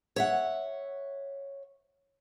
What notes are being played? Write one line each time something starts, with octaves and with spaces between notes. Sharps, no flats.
C#5 E5 F#5